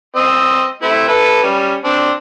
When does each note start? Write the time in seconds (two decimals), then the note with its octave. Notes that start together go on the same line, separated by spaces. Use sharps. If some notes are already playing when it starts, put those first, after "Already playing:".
0.16 C4 D#5 E6
0.82 A3 C4 E4
1.08 E4 A4 B4
1.43 G3 C#4
1.85 C4 D4